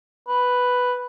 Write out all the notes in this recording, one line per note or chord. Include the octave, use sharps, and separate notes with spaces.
B4